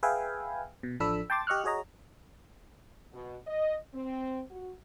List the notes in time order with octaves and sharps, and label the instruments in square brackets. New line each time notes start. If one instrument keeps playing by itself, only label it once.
[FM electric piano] G#4 B4 E5 F5 G5 G#5
B2
A1 F3 D4 A4 B5 E6
G5 A5 C6 D6 A6
G4 D#5 C#6 F6 F#6
F#4 G#4 C#5 D#5 A#5
[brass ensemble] B2
D#5
C4
F#4